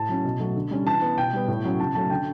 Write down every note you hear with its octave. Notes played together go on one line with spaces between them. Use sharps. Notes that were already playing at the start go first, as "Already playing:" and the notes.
Already playing: A2 A5
F#3 C#4
B2
F#3 A3
D3
G3 C#4
E3 A5
B3
B2 G5
G3 B3
A2
F#3 C#4
C#3 A5
F#3 A3 C#4 A5
D3 G5